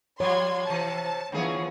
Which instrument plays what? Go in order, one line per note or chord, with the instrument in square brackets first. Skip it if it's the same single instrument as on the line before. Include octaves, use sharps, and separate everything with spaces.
[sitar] F3 G3 [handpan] C#5 [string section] C6 G#6
[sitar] C3 E3 [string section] A5
[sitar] D3 G#4 C#5 [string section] E3 F3 B3